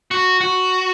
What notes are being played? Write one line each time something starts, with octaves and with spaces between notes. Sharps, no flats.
F#4
F#4